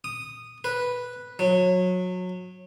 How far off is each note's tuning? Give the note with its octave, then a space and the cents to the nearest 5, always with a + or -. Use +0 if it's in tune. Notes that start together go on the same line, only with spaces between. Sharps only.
D#6 -10
B4 -5
F#3 -25